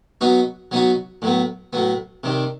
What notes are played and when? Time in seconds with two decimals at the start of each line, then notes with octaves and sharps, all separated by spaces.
0.21 F#3 B3 D#4 F#4
0.71 F#3 B3 D#4 F#4
1.22 A2 F#3 B3
1.73 A2 F#3 B3
2.23 C3 D#3 G3